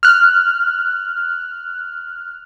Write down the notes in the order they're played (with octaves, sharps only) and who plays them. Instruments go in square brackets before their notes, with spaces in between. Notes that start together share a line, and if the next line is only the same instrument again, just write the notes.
[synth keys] F6 F#6